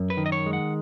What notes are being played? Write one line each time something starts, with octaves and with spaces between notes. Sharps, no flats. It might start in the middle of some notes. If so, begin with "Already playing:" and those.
Already playing: F#2
B4
D#3
D#5
C#5
G#3
F#5